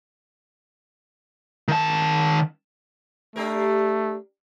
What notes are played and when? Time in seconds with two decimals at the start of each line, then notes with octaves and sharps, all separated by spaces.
1.68 D#3 A5
3.36 A3 D4 G4 A#4